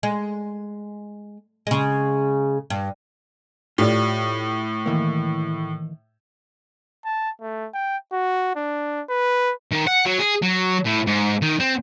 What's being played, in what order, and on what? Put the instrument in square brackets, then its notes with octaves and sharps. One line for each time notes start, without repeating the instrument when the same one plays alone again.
[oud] G#3
C#3 G#3
G2
[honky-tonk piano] A2 [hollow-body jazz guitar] F4 G4 D5
[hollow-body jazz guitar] D#3 E3 A#3
[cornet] A5
A3
G5
F#4
D4
B4
[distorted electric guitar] D#3
F#5
F#3
G#4
F#3
A2
G#2
D#3
C4